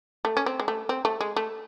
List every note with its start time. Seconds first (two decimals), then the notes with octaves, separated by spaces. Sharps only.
0.25 A3
0.37 C#4
0.46 C4
0.60 G#3
0.68 A3
0.89 C4
1.05 A3
1.21 G#3
1.36 A3